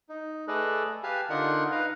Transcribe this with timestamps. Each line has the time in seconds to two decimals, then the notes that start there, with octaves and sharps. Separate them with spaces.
0.09 D#4
0.48 A3 G#4 A4 B4 D5 D#5
1.03 G4 B4 F5 G#5 A5
1.30 D3 D4 D#4 F4 A#4 F#5
1.72 D#4 B4 D#5 F5